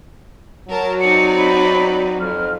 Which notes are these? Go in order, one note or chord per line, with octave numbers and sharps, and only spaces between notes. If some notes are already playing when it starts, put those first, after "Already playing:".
F#3 A#4 A5
C4 D#4 D5 C#7
B5
F2 F6